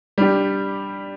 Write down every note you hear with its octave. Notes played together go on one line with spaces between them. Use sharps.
G3 D4 G4